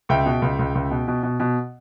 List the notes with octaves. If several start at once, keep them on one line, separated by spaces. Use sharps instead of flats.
C#2 E5 G5
B2
C#2
C#2
C#2
B2
B2
B2
B2